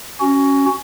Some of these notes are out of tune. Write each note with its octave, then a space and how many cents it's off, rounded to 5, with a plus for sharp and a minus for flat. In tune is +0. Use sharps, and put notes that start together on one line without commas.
C#4 +0 F#4 +15